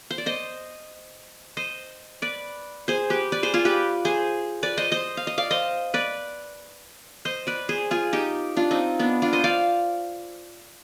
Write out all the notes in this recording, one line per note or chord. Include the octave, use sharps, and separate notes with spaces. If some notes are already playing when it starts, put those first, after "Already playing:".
C5
D5
C5 D#5
C5 D#5
B4 D5
G#4 C5
G4 B4
B4 D5
G#4 C5
F4 G#4
G4 B4
G#4 C5
B4 D5
C5 D#5
C5 D#5
F5
D#5
D5 F5
C5 D#5
B4 D5
C5 D#5
B4 D5
G#4 C5
F4 G#4
D#4 G4
D4 F4
C4 D#4
B3 D4
D4 F4
C5 D#5
D5 F5